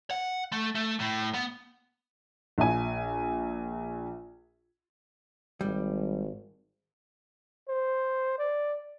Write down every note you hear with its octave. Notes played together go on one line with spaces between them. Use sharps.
F#5
A3
A3
A2
B3
A#1 E5 G#5
G#1 G3
C5
D5